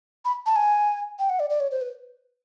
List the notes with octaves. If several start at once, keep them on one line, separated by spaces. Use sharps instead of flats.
B5
A5
G#5
G5
F#5
D5
D5
C#5
C5
B4